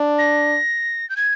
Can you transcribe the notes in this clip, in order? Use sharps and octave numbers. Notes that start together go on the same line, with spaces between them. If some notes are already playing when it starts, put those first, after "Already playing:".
Already playing: D4
A#6
G6
G#6